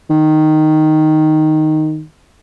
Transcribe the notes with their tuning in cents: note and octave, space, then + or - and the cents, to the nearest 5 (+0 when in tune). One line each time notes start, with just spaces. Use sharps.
D#3 -5